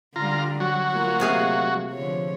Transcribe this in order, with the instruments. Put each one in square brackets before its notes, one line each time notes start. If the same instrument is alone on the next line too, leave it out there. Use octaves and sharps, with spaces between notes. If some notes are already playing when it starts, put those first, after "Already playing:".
[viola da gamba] D3 G3 [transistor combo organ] F4 A#5
[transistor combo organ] F#3 F#4
[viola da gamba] A3 A#3 F4
[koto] C3 G#4 F5
[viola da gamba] D3 F3 C#5